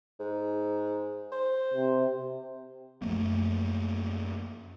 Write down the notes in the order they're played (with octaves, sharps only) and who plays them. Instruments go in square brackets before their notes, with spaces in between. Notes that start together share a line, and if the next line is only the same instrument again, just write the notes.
[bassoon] G#2
C5
[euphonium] C3
[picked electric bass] F#2 F3 A3 A#3